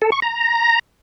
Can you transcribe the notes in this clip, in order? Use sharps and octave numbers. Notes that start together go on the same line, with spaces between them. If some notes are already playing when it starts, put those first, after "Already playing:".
A4
C#6
A#5